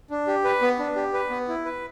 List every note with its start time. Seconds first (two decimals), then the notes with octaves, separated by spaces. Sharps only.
0.10 D4
0.27 G4
0.44 B4
0.62 B3
0.79 D4
0.96 G4
1.14 B4
1.30 B3
1.48 E4
1.65 B4